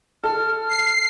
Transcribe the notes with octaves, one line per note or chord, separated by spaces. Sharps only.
A4 F6
C7